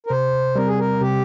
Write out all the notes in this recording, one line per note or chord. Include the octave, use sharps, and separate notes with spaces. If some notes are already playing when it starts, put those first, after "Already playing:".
A#4
C3 C5
G3 C4 A#4
G#4
A#4
C3 G4